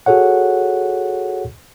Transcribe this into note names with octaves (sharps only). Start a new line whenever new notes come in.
F#4 G#4 A4 C#5 F#5